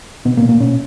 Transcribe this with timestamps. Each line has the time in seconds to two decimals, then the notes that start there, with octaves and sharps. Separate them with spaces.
0.25 B2 B3
0.37 A#3
0.42 B2
0.49 A#3
0.60 B2 C#4